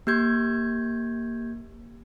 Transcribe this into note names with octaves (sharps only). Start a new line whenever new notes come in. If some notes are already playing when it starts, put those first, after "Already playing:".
A#3 G4 G6 G#6